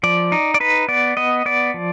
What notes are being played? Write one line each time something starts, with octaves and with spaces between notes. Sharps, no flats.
F3 D5
D#4
D5
D#4 B4
B3 D5
B3 D#5
B3 D5
F3